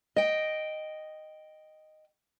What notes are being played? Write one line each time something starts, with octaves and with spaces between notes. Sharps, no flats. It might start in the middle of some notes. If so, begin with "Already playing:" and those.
D#5 G5